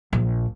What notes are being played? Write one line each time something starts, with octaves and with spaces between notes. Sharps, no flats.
A#1